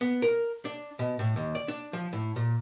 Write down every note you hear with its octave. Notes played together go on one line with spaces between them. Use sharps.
B3
A#4
D4
B2
A2
D#2
D5
D4
F3
A2
A#2